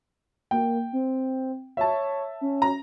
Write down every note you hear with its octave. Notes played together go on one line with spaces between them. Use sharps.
A#3 G5
C4
C#5 E5 A5
C#4
A#5